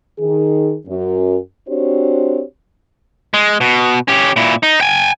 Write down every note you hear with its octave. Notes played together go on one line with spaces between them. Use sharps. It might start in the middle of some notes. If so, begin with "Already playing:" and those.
D#3 G#4
F#2
C4 D4 F#4 G4 C5 C#5
G#3
B2
C#4 G4
A#2 E4
D#4
G5 G#5